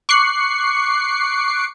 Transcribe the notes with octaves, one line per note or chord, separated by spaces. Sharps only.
C#6 D6 F#6 C7 C#7